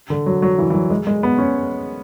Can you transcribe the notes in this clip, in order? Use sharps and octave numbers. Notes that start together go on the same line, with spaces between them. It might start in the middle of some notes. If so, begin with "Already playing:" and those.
D3
F#3
F#3
E3
E3
F#3
G#3
G#3
B3
C#4